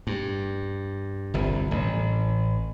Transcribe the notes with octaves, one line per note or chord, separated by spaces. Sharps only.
G2
G1 C2
A1